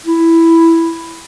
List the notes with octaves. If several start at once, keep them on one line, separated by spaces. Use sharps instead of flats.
E4